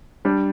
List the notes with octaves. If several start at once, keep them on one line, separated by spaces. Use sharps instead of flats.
G3 D4